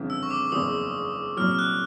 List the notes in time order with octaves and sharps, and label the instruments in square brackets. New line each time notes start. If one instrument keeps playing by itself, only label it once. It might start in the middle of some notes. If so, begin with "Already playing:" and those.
Already playing: [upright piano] G1 F2 C#3 E3
[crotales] E6
C#6
D6
[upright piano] F#1 E2 C#3 [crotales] D#6
[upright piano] C2 A#2 F#3 [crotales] F6
[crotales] F6
F#6